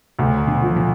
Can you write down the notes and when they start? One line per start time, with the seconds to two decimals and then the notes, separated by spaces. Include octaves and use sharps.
0.19 D2 A2 C3
0.47 B2 D3
0.62 F3
0.76 B2 D3